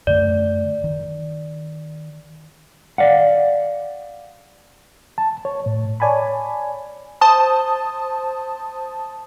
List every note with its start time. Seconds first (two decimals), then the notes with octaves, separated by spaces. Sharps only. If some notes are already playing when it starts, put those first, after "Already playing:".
0.07 F#2 D3 A3 D5
0.84 D#3
2.98 D5 F5 F#5
5.18 A5
5.45 C#5
5.66 A2
6.00 C#5 D5 G#5 A5 B5
7.21 C5 A5 D#6